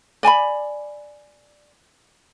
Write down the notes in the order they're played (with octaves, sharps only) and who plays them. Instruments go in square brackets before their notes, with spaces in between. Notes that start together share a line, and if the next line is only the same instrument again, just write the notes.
[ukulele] D5 G#5 A5 B5